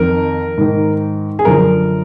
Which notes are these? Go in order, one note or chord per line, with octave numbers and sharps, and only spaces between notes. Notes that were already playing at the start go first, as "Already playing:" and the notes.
Already playing: F2 D#3 A#4
G#2 D#3
G#4
F#2 D3 F3 A#4